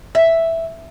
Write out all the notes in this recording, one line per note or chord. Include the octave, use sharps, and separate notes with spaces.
E5